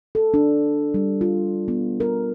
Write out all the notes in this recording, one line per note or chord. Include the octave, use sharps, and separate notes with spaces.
A4
D4
G3
F4
B3
A#4